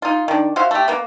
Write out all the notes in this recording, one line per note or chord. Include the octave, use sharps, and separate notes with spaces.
D#4 F4
D#3 D4
F#4 C5 E5 F5
A3 G4
A#3 B3